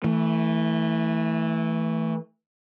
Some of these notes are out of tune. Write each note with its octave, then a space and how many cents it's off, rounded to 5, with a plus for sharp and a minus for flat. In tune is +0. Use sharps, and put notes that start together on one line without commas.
E3 -15 A3 +15